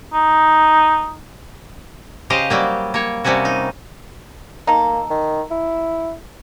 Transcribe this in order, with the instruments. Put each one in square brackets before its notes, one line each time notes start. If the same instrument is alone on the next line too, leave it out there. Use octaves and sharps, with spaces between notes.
[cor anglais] D#4
[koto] C#3 G4 C5 D#5 F5
F#3 G3 A#3
A#3 C#5
C3 G3 A#3 C#4 F#4
D#4
[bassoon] A#3 [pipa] D#4 A4
[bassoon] D#3
E4